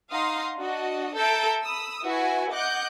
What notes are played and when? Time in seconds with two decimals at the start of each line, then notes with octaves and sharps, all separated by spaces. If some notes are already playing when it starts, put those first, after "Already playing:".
0.11 D#4 F5 F#5 A#5 C6 D#6
0.57 D4 F#4 D#5
1.16 A4 E5 A#5 E6 G6 D7
1.63 B5 D#6 E6
2.03 E4 F#4 B4 E5 F#5 G#5
2.51 D#5 F#5 D6 F#6 G6